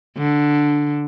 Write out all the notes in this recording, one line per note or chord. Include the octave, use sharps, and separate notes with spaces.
D3